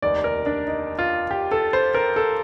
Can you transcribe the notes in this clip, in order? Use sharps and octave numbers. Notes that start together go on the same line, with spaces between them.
F1 D#2 D#3 D5
A#4
D4
D#4
F4
G4
A4
C5
A#4
A4